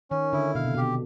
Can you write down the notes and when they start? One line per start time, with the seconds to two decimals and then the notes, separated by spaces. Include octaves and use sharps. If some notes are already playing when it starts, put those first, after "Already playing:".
0.11 D#3 C#4
0.33 D3 E4
0.55 B2 F5
0.65 C3
0.75 B2 G4